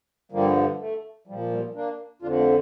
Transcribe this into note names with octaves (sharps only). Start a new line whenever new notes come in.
G2 D3 F3 G3 A#3
A3
A#2 F3 G3
G3 A#3
A#3 D4
F2 D3 F3 D4 F4
A3